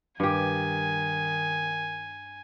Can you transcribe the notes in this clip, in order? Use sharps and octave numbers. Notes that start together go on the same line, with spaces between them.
G2 D#3 G4 G#5